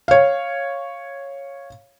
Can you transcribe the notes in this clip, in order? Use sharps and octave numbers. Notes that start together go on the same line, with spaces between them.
C#5 F5